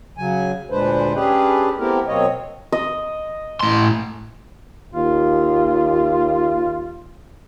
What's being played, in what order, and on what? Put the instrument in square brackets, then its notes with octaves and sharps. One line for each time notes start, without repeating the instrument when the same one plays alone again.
[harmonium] C#3 F#3 G#5
D2 A#2 G#3 D4 B4 C5
G3 C#4 D4 G4 G#4 B4
A3 B3 C4 E4 G4 A#4
B2 F#3 A#3 C4 C#5 D#5
[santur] D#5
[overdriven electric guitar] A2 C6
[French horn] D#2 [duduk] F4